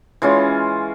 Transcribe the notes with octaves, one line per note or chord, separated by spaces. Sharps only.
E3 G#3 C#4 F4